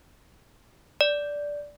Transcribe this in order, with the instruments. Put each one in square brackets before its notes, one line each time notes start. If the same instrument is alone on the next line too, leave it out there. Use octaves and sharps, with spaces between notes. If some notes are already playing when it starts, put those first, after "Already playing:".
[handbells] D5